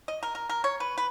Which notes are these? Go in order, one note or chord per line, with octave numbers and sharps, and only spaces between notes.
D#5
A#4
A#4
A#4
C#5
B4
B4